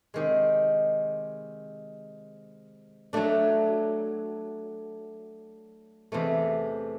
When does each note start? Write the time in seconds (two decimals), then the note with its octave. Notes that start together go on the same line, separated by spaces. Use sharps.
0.14 C3 D#3 G#3
3.13 F#3 A3 D4
6.12 E2 C3 E3 A3